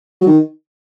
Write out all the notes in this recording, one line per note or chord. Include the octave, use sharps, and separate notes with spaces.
F#3
D#3